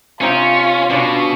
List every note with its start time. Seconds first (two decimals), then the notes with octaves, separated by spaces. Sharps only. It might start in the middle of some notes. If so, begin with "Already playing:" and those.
0.21 C3 C#4 D#4 F4 G5
0.90 B2 C#4 D4